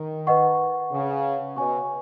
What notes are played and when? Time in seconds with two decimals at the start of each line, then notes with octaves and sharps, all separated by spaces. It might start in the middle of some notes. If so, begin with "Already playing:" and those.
Already playing: D#3
0.27 B4 D#5 F#5 C#6
0.92 C#3
1.56 B2 C#5 G#5 C#6